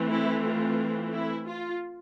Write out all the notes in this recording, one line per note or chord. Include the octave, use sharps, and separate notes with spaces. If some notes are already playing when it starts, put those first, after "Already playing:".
Already playing: E3 A3 C4
E4
F4
E4
F4